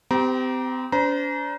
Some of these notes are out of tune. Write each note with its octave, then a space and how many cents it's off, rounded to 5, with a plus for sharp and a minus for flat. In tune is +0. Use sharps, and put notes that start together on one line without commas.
C4 -35 G4 +0 A#5 +20
D4 -45 C5 -35 A#5 +20